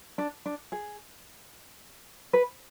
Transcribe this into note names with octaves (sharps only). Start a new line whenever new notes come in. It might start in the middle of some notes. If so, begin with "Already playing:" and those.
D4
D4
G#4
B4